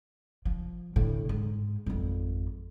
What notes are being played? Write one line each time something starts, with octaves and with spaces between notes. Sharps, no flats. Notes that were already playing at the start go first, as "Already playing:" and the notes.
F3
A2 D3
G#2
G#1 F2